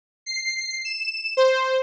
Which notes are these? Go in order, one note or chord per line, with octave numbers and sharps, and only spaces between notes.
C7
E7
C5